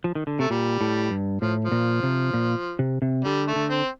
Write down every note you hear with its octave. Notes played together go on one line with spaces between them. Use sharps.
F3
D#3
D3
C3 A3
A#2 G3
A2
G2
A2 F3
F3
A#2
C3
A#2
C3
C3
D3 G3
A3
D3
C4